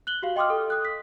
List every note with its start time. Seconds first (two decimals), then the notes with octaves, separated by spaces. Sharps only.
0.07 F#6 F#7 G7
0.22 F#4 G4 F5
0.36 D#5 G5 C6 D6 D#6 F6
0.50 A4
0.70 D#6 F#6
0.85 B6